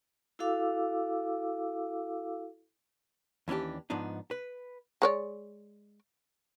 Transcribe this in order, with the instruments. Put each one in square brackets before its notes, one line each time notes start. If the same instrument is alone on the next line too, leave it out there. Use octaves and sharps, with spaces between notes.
[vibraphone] E4 F#4 A4 F5 D6 E6
[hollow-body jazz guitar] D#2 E3 C#4 D4 G4
G#2 F3 B3 D4 D#4
B4
[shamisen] G#3 C#5 D5